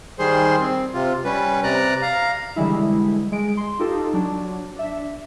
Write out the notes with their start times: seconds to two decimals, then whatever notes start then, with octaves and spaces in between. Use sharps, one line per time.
0.19 D#3 G3 G#4 C5 C6
0.60 C4
0.94 C3 F4
1.25 G3 C#4 B4
1.64 C3 D5 A#5 F#6
2.02 F5 A#5
2.56 D3 E3 G3 G#3 E4
3.32 G#3 D7
3.57 C6
3.79 D#4 F4 G4 A4
4.13 F#3 D4
4.76 D4 E5